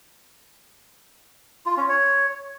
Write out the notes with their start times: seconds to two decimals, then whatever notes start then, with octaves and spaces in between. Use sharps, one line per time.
1.66 F4
1.77 C#4
1.89 C#5